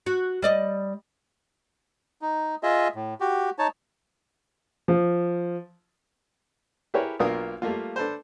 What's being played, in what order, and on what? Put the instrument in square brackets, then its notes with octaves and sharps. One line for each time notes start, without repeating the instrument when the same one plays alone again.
[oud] F#4
G3 D5 D#5
[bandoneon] D#4
F4 G#4 D#5 E5
A2
F#4 G4
D#4 C#5 A5
[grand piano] F3
[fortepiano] E4 G4 G#4 A#4 B4 C#5
B1 A#3 D4 F4 A#4 D#6
G3 A3 A#3 F4
D4 A4 B4 C5